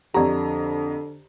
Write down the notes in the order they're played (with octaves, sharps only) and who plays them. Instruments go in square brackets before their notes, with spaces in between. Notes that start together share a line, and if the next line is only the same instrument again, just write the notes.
[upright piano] F2 A#5 [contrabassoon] D3 [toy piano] G4 D5 D#5